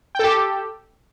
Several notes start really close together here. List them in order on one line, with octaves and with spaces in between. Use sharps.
G5 A4 G4